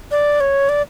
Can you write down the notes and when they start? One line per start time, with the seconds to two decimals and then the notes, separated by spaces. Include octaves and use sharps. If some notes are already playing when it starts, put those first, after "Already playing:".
0.11 D5
0.40 C#5
0.69 D5